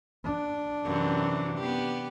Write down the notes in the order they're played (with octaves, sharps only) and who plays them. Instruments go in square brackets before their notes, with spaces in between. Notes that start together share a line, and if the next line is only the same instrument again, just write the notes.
[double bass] D4
[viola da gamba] F#2 C3 E3
B3 G4